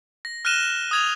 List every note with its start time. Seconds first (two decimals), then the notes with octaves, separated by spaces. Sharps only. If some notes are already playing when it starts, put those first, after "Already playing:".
0.25 A#6
0.45 F6 F#6 A#6 D#7 E7 G7
0.91 D#6 G#6 F7